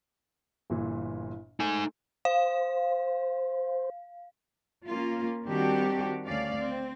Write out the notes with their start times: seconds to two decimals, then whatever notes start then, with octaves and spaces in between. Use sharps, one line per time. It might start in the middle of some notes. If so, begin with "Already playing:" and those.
0.70 G1 A#2 E3
1.60 A3 D#4 G#5 C6
2.25 C5 F5
4.87 A#3 C#4 F4
5.45 D#3 G3 C4 D4 F#4 G4
6.24 D2 C#4 D5 F5
6.57 C4